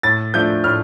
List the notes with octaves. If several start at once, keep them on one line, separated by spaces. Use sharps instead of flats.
A2 A6
F3 A3 D4 G6
A2 F6